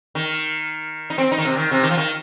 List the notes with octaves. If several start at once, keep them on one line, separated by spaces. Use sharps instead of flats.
D#3
D#4
C4
D#4
D#3
C3
D#3
C3
D#3
F3
D#3